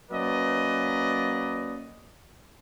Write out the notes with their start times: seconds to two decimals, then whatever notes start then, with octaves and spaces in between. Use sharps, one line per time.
0.11 F#3 A#3 C#4 B4 D5 D#5